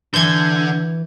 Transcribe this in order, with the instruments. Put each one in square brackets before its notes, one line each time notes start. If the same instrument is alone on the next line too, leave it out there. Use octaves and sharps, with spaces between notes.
[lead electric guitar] D3 [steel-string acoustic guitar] E3 B4 [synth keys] G6 G#6